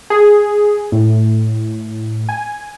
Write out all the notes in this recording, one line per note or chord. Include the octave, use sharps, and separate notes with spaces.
G#4
A2
G#5